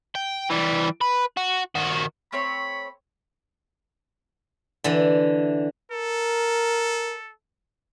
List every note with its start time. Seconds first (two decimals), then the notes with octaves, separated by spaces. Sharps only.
0.15 G5
0.50 E3 G3
1.01 B4
1.37 F#4
1.75 D#3 F#4
2.32 A3 C4 C#5 B5
4.84 D3 E3
5.91 A4 A#4